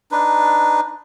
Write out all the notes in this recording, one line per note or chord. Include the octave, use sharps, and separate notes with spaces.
D4 D#4 B4